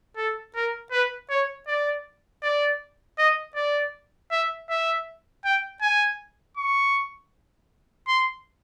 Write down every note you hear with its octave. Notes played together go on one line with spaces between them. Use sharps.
A4
A#4
B4
C#5
D5
D5
D#5
D5
E5
E5
G5
G#5
C#6
C6